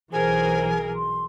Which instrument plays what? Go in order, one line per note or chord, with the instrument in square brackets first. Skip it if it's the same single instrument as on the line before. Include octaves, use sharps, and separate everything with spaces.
[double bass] B1 E3 [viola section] G#4 A#4 [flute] C5 [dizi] G#5
[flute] C6